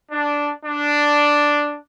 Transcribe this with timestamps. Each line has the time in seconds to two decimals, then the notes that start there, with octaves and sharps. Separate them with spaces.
0.12 D4
0.65 D4